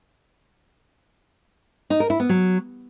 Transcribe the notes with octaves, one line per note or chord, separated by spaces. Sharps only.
D#4
A#4
E4
B3
F#3